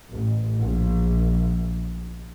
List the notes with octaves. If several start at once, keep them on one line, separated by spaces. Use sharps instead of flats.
A1
A#1